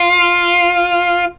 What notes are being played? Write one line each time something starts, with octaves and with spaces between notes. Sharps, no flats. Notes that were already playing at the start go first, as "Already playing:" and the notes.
Already playing: F4